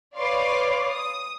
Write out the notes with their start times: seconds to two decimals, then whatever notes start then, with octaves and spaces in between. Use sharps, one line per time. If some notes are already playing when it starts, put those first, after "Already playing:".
0.16 B4 C#5 D5 F5 C6 D6
0.88 D#6